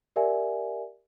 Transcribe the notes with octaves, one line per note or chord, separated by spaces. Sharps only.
G4 A#4 D5 E5 F#5 G#5